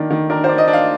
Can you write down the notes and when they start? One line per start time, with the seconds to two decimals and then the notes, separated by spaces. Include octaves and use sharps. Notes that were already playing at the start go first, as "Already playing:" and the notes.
Already playing: D#3 A#3 D4
0.10 D#3
0.30 D4 A#4
0.44 C5
0.49 D4
0.58 D#5
0.68 D4
0.73 F5